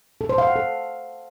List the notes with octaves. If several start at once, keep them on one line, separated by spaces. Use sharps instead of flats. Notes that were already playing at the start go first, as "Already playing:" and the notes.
A4
C5
F5
F#5
A4